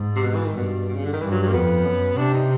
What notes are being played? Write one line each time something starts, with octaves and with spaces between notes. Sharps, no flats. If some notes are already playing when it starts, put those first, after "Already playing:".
Already playing: G#2
C3
B2
E3
D#3
G2 B2
B2
C#3
D3
D#3
G2 E3
F#3
F#3
A#3
F2 B3
F#2
C3 D4
D#4